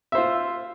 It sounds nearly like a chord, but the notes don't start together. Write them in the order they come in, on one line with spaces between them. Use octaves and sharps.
E5 C5 F4